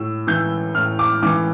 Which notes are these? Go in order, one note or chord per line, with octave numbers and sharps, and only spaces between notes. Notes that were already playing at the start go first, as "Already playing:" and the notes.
Already playing: A2 E6
E3 G6
A2 F6
D6
E3 D6